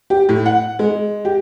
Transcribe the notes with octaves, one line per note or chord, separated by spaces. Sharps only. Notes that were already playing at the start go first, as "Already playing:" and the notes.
G4
A2
F#5
G#3
G4